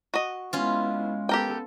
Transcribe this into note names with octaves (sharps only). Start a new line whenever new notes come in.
F#4 D#5
G#3 B3 C#4 E4 F4
B3 G4 A4 A#4 G5